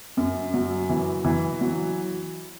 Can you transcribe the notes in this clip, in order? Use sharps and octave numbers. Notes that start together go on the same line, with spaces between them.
F#2
F#3
E3
E3
F#3